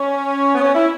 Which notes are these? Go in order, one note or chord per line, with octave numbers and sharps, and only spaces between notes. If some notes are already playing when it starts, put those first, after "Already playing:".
Already playing: C#4
B3
C#4
E4